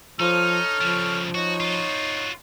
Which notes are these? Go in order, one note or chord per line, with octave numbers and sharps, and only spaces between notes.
F3 D#4 A4 C#5 F6
C#3 F3 G3
D#4 F#4 C#5
F4 F#4